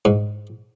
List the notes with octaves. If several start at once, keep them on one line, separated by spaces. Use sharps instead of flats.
G#2